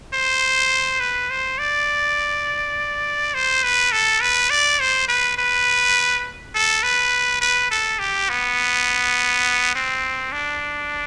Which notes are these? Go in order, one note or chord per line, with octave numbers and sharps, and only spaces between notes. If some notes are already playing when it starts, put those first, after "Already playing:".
C5
B4
C5
D5
C5
B4
A4
B4
D5
C5
B4
B4
A4
B4
B4
A4
G4
B3
C4
D4